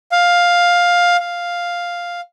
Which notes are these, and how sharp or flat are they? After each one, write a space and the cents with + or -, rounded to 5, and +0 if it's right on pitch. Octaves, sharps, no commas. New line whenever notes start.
F5 +10
F5 +0